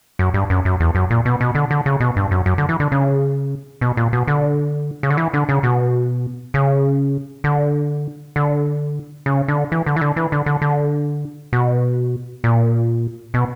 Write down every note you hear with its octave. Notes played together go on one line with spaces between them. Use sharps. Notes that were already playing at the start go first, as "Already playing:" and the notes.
F#2
G2
F#2
F#2
E2
F#2
A#2
B2
B2
D3
D3
C#3
B2
G2
F#2
F#2
D3
E3
D3
C#3
B2
A#2
B2
D3
C#3
D3
E3
D3
C#3
B2
C#3
D3
D3
C#3
D3
E3
D3
E3
D3
E3
D3
D3
D3
B2
A#2
B2